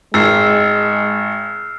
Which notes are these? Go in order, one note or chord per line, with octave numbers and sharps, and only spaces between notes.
G#1 G#3 E6 F6 C7